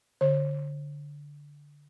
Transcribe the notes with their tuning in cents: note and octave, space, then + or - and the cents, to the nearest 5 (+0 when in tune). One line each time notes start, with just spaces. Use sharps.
D3 -10 C5 +45